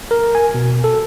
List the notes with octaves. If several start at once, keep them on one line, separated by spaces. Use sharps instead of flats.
A#4
G#5
B2
A4